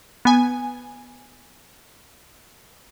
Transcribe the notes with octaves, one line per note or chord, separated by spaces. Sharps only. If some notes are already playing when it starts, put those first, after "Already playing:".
B3 G#5